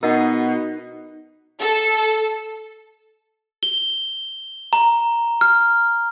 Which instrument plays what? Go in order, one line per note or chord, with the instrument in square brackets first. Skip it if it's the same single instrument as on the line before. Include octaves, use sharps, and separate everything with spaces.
[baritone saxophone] B2 [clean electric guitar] D#4 [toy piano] A#4 D#5 F#5
[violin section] A4
[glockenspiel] G7
A#5
F6